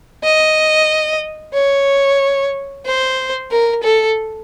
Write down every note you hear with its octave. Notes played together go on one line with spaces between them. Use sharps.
D#5
C#5
C5
A#4
A4